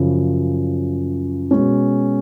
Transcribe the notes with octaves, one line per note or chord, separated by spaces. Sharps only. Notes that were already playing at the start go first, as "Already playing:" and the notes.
Already playing: F#2 C#3 F3
B2 G#3 C#4